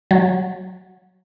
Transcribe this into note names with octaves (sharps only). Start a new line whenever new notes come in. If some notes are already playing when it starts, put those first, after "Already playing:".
F#3